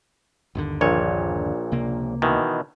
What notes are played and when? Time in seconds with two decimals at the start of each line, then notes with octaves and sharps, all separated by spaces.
0.55 G1 D#2 D3
0.81 A#1 A#2 C#5
1.72 C#2 C3 A#3
2.22 B2 D#3 E3